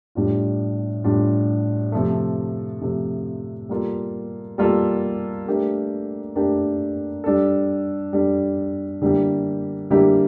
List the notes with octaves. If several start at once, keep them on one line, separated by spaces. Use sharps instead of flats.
A2 G3 D4 F4
A2 G3 D4 F4
C3 F3 A3
C3 F3 A3
G3 A#3 F4 A4
G3 A#3 F4 A4
A3 D4 G4 A#4
A3 D4 G4 A#4
G3 D4 A4
G3 D4 A4
D3 G3 A#3 E4 G4
D3 G3 A#3 E4 G4